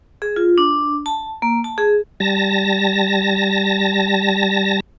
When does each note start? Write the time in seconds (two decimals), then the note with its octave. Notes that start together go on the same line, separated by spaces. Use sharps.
0.22 G#4
0.36 F4
0.58 D4
1.06 A5
1.42 A#3
1.64 A5
1.78 G#4
2.20 G3 A5 A#6